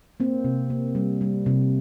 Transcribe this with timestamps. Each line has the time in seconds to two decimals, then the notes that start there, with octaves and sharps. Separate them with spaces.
0.20 A#3 C4
0.44 C3
0.70 A#3
0.95 G3
1.21 G3
1.46 C3